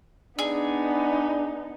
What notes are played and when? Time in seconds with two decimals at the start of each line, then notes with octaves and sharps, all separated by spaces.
0.39 B3 D4 D#4 G#4